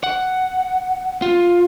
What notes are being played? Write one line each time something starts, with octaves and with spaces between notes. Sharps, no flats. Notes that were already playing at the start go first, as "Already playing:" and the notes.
F#5
F4